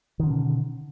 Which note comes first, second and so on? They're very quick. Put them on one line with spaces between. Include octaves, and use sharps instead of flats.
D#3 D3 C#4 B2